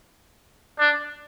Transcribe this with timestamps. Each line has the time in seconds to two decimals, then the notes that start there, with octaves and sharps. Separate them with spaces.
0.79 D4